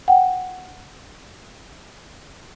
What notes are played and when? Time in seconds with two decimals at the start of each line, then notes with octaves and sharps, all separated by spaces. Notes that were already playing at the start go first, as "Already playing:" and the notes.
0.08 F#5 G5